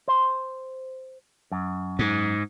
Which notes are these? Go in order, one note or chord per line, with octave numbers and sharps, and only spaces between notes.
C5
F#2
G#2